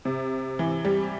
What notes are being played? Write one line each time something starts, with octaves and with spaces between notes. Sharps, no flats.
C3
E3
G3